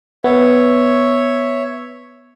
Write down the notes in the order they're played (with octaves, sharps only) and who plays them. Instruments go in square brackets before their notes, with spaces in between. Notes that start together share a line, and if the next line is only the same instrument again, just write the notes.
[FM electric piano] B3 [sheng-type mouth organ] C#5 E5